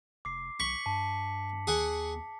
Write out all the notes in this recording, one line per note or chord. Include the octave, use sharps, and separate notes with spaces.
F1 D6 C7
B1 C#6 B6 C#7 F#7
G2 A5
D#2 G#4 F#5 G#5